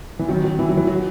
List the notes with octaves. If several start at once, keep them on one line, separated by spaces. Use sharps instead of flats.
E3
D#3 F#3
D#3 F#3
E3
F#3
E3
F#3